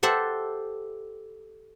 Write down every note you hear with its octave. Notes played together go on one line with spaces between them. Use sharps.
G4 A4 C5 E5 F#5